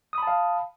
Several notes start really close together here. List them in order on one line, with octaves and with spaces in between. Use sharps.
D#6 B5 A5 F5